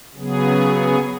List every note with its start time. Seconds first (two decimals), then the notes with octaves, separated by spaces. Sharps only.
0.15 C#3 F#3 B3 G#4